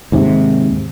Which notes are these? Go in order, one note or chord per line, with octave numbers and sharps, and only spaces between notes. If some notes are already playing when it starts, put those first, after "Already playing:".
D#2 G#2 C3